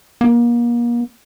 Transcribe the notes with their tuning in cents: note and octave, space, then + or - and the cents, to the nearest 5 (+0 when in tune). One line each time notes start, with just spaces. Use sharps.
A#3 +35